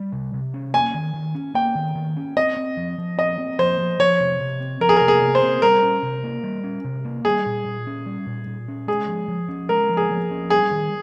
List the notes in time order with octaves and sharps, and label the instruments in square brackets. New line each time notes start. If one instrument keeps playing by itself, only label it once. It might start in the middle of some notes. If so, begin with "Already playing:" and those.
Already playing: [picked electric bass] G3
C3
C3
C#4
[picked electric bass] A#3 [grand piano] G#5
[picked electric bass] D#3
D#3
C#4
[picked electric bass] A#3 [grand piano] G5
[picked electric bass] D#3
D#3
C#4
[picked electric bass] C4 [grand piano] D#5
[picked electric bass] C4
F3
F3
[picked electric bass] C4 [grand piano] D#5
[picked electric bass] C4
[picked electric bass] F3 [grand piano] C5
[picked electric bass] F3
[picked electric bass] F3 [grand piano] C#5
[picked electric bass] C3
C3
C4
[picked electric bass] F3 [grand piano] A#4
[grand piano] G#4
A#4
[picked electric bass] C3
[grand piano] G#4
[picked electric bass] C3
[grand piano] C5
[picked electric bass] C4
[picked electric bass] G3 [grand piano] A#4
[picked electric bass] C#4
C3
A#3
G3
C#4
C3
A#3
[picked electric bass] G3 [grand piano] G#4
[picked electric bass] A#2
A#2
C#4
G3
A#2
A#2
C#4
[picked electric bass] G#3 [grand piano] G#4
[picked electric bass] F3
F3
C#4
[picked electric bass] G#3 [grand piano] A#4
[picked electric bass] F3
[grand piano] G#4
[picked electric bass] F3
C#4
[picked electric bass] G3 [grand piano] G#4
[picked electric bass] D#3